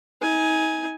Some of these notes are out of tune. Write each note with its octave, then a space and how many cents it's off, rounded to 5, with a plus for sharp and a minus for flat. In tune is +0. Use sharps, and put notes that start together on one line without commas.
D#4 +40 G#5 +0